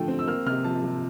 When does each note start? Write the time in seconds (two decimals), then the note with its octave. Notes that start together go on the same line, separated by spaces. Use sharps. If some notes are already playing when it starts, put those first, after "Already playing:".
Already playing: D3 F3 A3 G5
0.08 C4
0.19 E6
0.27 A#3 F6
0.46 C3 F6
0.64 F3 A5
0.84 C3